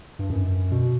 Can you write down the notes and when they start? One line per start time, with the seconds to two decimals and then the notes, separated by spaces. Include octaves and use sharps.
0.19 G2
0.30 F#2
0.72 B2